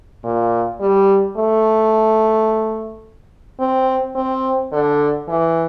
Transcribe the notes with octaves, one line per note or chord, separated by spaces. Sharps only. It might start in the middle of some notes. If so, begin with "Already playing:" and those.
A#2
G3
A3
C4
C4
D3
E3